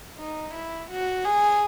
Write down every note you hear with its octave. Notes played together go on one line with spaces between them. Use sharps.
D#4
E4
F#4
G#4